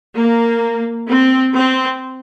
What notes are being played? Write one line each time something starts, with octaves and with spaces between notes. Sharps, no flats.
A#3
C4
C4